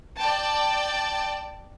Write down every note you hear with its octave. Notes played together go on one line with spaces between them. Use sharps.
D5 G5 A5